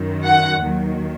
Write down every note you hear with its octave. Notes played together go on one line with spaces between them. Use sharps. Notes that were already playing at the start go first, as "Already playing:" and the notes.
Already playing: F#2 D#3 F#3
F#5
D#2 D#3 F#3